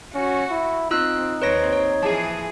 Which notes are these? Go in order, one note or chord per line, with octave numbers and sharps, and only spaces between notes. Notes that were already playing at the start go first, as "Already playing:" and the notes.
C#4 F#4
E4
C4 D#4 F4 E6 F#6
D#2 C4 B4 C#5 A#6
C#5
E3 F3 G#4 A5